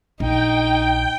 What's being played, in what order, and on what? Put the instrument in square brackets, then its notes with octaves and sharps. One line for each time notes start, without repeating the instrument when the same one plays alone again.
[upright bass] A#1 [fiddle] D#4 [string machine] G5